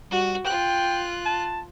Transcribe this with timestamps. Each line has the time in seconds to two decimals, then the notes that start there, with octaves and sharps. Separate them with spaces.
0.11 G3 F#4
0.46 F4 G5 F#6
1.25 A5